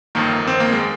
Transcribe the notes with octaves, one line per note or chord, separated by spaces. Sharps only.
G1 F2 D#3 A#3
C4
A#3
G#3